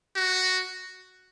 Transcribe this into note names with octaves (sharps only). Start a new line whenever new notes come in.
F#4